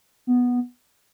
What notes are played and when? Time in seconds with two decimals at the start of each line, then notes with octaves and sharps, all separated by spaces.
0.27 B3